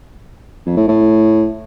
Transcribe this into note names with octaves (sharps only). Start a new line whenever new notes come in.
F2
A2
A2